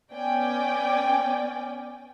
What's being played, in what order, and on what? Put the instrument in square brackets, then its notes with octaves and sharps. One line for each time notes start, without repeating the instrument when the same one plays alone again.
[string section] B3 C#4 D5 G5 G#5